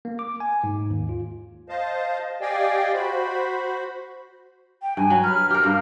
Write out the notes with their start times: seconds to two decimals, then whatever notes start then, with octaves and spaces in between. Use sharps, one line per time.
0.05 A#3
0.19 D6
0.40 G#5
0.64 G#2
0.90 D#2
1.09 F4
1.68 C5 D#5 F5 A5
2.41 G4 D5 D#5 F5 G5 G#5
2.94 F#4 C5 B5
4.82 G5
4.97 G2 G#5
5.10 F#3
5.24 B4 F6
5.50 G4 A#4
5.64 G2 A#3